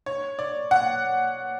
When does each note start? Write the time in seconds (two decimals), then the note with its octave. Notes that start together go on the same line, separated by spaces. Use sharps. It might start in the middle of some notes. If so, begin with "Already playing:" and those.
0.06 C#5
0.39 D5
0.71 F#5